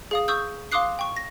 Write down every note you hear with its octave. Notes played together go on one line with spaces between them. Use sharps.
G#4 F5 D#6
C#6 D#6 E6 G6
F5 C6 D6 D#6 F#6 C7
G5 C#6
A#6